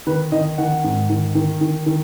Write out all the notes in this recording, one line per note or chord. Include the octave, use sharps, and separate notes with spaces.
D#3 B4
D#3 D#5
D#3 F#5
G#2
D#3
D#3
D#3
D#3